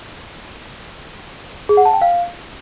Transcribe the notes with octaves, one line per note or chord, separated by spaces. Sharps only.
G#4
F#5
A5
G5
F5